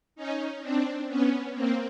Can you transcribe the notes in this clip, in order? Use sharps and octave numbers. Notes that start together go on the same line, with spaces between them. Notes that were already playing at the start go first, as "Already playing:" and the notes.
C#4 D#4
C4 D4
B3 C#4
A#3 C4